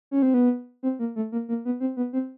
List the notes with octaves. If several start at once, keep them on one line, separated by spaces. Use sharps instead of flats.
C#4
C4
B3
C4
A#3
A3
A#3
A#3
B3
C4
B3
C4